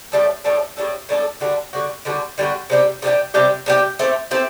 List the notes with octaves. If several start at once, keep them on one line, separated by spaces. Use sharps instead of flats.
A2 G3 D4 A4
A2 G3 D4 A4
A2 G3 D4 A4
A2 G3 D4 A4
D3 G3 D4 F#4
D3 G3 D4 F#4
D3 G3 D4 F#4
D3 G3 D4 F#4
C3 G3 D4 G4
C3 G3 D4 G4
C3 G3 D4 G4
C3 G3 D4 G4
A3 C4 G4
A3 C4 G4